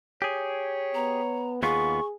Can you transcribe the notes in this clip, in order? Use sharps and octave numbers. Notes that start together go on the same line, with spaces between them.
G4 G#4 C#5
B3 A#5
D#2 B3 F4 G#4 C#6